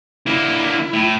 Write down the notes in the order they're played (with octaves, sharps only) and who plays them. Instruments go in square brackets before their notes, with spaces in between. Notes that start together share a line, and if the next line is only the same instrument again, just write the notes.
[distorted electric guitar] D3 A#3 [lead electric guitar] E4
[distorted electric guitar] A2